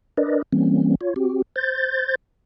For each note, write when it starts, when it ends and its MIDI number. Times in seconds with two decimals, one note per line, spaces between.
0.17 0.42 62
0.17 0.42 70
0.17 0.42 71
0.17 0.42 74
0.17 0.42 75
0.53 0.95 52
0.53 0.95 55
0.53 0.95 58
0.53 0.95 60
0.53 0.95 61
1.01 1.14 65
1.01 1.14 73
1.16 1.42 60
1.16 1.42 66
1.16 1.42 67
1.56 2.15 72
1.56 2.15 91
1.56 2.15 93